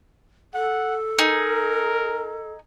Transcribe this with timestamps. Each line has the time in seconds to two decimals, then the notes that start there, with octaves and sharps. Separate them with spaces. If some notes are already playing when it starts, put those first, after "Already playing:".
0.54 A4 F#5
1.19 D#4 G#4 A#4